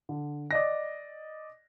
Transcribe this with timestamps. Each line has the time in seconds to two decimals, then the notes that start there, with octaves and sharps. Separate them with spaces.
0.09 D3
0.51 D5 D#5 A#6